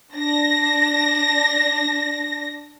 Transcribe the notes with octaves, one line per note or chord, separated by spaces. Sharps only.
D4 A#6